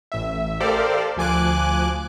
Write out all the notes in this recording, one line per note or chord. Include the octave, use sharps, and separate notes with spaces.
A1 E5
G4 A4 A#4 C5 D5 F5
D2 F3 G#5 D6 F#6